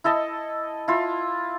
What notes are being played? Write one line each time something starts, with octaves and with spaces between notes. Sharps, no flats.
E4 A4 D#5 A5
E4 F4